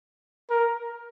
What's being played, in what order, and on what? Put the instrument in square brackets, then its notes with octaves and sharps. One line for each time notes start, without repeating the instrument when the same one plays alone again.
[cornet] A#4